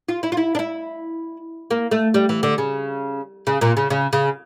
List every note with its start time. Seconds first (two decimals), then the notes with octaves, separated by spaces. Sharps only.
0.09 F4
0.23 E4
0.32 F4
0.37 E4
0.55 D4
0.59 E4
1.71 A#3
1.91 A3
2.14 G3
2.29 E3
2.43 D3
2.58 C#3
3.47 C#3
3.61 A#2
3.77 C#3
3.90 C#3
4.13 C#3